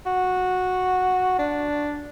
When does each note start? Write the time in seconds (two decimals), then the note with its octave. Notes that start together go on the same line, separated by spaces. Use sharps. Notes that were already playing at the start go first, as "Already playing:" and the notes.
0.06 F#4
1.39 D4